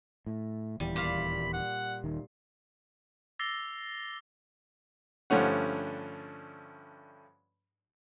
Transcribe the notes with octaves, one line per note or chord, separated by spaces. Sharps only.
A2
D#1 E2 E3 G3
A#2 F5 B5
F#5
D#1 D#3
D6 E6 A6 A#6 C7 G7
G2 D3 F3 A3 C#4 F#5